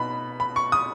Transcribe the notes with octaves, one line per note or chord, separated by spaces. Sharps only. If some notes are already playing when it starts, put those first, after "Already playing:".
Already playing: B2 B3 D#4 B5
B5
C#6
D#6